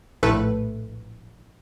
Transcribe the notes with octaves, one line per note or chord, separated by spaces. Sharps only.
A#1 A2 A3 A4 B4